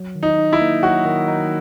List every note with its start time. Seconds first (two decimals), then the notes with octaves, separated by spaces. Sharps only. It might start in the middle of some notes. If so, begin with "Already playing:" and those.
Already playing: F#3
0.15 D#3
0.23 D#4
0.38 D#4
0.53 E4
0.61 A#3
0.83 F#3 F#4
1.05 D#3
1.28 D#4